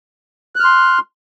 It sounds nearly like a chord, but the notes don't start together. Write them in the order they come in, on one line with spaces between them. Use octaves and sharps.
F#6 F6 C6